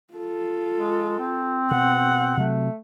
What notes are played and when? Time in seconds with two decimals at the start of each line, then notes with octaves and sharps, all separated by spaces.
0.14 F4 A4
0.75 G#3
1.18 C4
1.71 B2 F#5
2.37 C3 F#3 A3